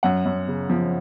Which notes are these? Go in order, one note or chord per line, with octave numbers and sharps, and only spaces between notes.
F#2 F#5
F#2
C#3
F3